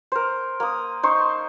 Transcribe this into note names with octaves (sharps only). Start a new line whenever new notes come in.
A#4 C5
A#3 D#6
D#4 C5 C#6